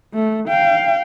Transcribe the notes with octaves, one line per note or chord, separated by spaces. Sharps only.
A3
F5 G5